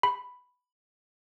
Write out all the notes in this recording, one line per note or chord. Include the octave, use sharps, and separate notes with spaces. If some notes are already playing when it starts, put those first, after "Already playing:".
B5